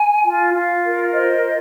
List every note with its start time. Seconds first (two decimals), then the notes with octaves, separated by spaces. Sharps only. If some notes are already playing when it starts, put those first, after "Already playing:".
Already playing: G#5
0.23 F4
0.53 F4 F5
0.83 A#4
1.12 C5 D#5
1.41 F4